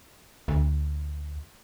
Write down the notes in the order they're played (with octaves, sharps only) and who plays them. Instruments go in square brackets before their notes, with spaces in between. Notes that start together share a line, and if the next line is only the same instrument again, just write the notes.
[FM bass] D2